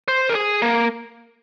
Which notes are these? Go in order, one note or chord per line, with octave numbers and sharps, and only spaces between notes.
C5
A#4
G#4
A#3